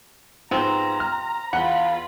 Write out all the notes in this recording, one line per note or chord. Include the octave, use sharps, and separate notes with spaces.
G#2 C3 F3 B3 C4 A#5
F6
E2 F4 F#5 B5 G7